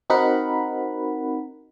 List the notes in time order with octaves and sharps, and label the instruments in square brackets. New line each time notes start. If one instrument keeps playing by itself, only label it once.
[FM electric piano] C4 D#4 F#4 A#4 F#5 B5